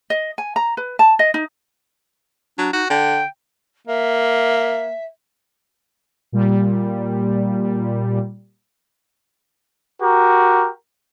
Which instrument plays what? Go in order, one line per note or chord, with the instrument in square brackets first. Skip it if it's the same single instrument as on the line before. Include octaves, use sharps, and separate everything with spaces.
[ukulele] D#5
G#5
A#5
B4
A5
D#5
D#4
[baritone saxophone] F#3 [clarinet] D4
[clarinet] D#4 [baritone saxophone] F#4
[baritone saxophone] D3 [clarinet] G5
[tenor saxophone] A#3 [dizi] E5
[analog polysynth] A#2 G3
[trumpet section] F#4 G4 A#4